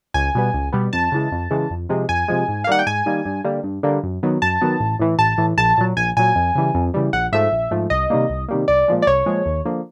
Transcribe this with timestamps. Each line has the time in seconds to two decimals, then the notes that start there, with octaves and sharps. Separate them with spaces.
0.14 C#2 G#5
0.35 B2 G3 B3
0.54 C#2
0.73 B2 G3 B3
0.93 F2 A5
1.12 C#3 E3 G#3
1.32 F2
1.51 C#3 E3 G#3
1.71 F2
1.89 C3 F3 G#3
2.09 F2 G#5
2.28 C3 F3 G#3
2.48 G#2
2.64 F5
2.67 D#3 G3 A#3 F#5
2.79 G5
2.86 G#2 G#5
3.06 D#3 G3 A#3
3.26 G2
3.44 D3 G3 A#3
3.64 G2
3.83 D3 G3 A#3
4.03 F#2
4.23 D#3 F#3 B3
4.42 F#2 A5
4.62 D#3 F#3 B3
4.80 A1
4.99 A2 E3
5.19 A1 A5
5.38 A2 E3
5.57 A#1 A5
5.78 A#2 F#3
5.97 A#1 G#5
6.17 A#2 F#3 G#5
6.35 F2
6.55 C#3 E3 G3
6.75 F2
6.94 C#3 E3 G3
7.13 A#1 F#5
7.32 G#2 F3 A3 E5
7.52 A#1
7.71 G#2 F3 A3
7.90 C2 D#5
8.10 C3 D#3 G3 A#3
8.30 C2
8.49 C3 D#3 G3 A#3
8.68 C2 D5
8.88 A#2 F3 G#3
9.02 D5
9.07 C2 C#5
9.26 A#2 F3 G#3
9.46 D#2
9.65 D3 F3 A#3